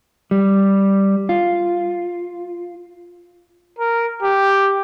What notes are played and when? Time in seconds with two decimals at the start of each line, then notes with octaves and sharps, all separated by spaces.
0.31 G3
1.29 F4
3.78 A#4
4.23 G4